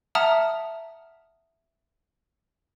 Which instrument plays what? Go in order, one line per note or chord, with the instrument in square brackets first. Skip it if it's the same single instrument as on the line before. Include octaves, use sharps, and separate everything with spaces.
[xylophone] E5 F#5 A5 A#5 D#6 F6